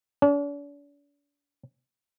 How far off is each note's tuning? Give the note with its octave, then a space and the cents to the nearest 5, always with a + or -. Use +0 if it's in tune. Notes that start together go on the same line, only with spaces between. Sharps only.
D4 -45